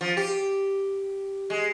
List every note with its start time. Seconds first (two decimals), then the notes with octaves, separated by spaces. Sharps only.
0.01 F3
0.17 G4
1.50 G#3